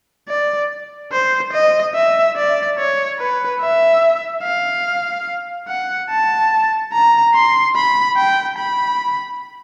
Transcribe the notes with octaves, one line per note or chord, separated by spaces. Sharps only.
D5
C5
D#5
E5
D5
C#5
B4
E5
F5
F#5
A5
A#5
C6
B5
G5
B5